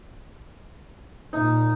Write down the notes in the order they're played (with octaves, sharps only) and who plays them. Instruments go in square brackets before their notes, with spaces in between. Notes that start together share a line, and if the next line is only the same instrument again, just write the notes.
[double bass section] A#2 [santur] D#4